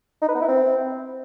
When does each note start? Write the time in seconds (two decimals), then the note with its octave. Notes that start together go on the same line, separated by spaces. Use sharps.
0.22 D#4
0.28 B4
0.35 B3
0.42 E4
0.48 C4